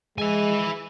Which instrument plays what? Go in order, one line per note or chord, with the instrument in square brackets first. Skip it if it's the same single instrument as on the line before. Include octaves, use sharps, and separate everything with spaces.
[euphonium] G#3 [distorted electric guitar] E4 G#5